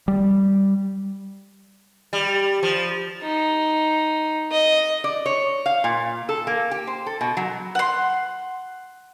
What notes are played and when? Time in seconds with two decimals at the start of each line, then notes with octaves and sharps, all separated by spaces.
0.08 G3
2.13 G3
2.63 F3
3.22 D#4
4.52 D#5
5.04 D5
5.26 C#5
5.66 F5
5.84 A#2
6.29 A4
6.47 A#3
6.71 G4
6.87 C5
7.06 A4
7.21 B2
7.37 F#3
7.75 F#5 C6